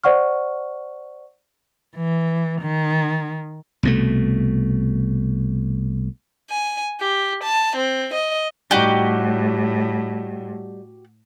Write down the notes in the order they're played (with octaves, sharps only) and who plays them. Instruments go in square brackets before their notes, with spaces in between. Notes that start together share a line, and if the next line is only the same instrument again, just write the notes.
[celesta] C5 D5 F#5 C#6 F6
[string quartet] E3
D#3
[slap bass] C2 B2 A3
[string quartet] G#5
G4
A5
C4
D#5
[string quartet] A2 [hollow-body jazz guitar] G3 D#4 [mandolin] F#4 G4